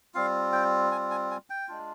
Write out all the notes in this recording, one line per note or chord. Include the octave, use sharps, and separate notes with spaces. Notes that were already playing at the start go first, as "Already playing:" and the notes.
G3 C4 F4 F5
G5
G#5
G#5
G#5
G5
G#3 D4 F4